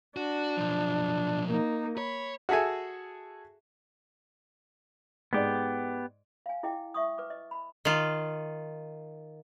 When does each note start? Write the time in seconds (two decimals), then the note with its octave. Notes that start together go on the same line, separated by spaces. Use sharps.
0.17 D4 F#4
0.57 B1 F3
1.48 A#3 D#4
1.98 C#5 B5
2.49 F#4 G#4 A4 E5 G#5
5.33 G#2 G#3 B3 G4 D5
6.46 F5 G#5
6.63 E4 G#4 D#5 G5
6.94 E5 C#6 D#6
7.18 B4 D6
7.30 D#5
7.51 B5
7.85 D#3 F4